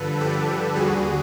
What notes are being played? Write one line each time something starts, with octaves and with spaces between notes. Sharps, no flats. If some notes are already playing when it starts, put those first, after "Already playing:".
Already playing: G2 D3 F3 A4 B4
G4 A4
D#2 D3 G3 F#4 G#4